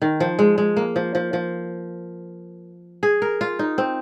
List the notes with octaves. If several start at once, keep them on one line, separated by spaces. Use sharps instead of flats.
D#3
F3
G#3
G#3
A#3
F3
F3
F3
G#4
A#4
F4
D#4
C4